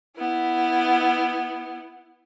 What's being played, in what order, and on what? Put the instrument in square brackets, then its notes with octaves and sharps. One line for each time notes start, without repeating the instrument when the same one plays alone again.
[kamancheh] B3 E4